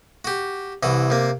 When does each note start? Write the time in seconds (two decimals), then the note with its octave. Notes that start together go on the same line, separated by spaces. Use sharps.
0.25 F#4 G4
0.83 C2 E3 F#4
1.10 C3 A#3